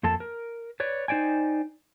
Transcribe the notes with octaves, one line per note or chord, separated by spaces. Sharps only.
F2 A#3 A4 A5
A#4
B4 C#5 D5
D#4 C5 D5 G5 G#5